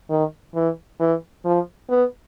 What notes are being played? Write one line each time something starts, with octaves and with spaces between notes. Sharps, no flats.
D#3
E3
E3
F3
B3